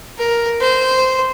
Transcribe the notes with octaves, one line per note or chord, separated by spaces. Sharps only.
A#4
C5